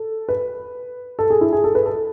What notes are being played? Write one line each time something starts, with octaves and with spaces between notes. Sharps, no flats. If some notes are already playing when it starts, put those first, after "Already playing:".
Already playing: A4
B4
A4
G#4
E4
G#4
A4
B4
A4